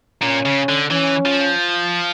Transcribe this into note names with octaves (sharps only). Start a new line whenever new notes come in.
A#2 C#4
C#3
D3
E3 C#4
F3